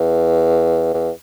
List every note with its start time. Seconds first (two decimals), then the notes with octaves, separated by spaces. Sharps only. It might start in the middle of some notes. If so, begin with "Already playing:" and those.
Already playing: E2
0.94 E2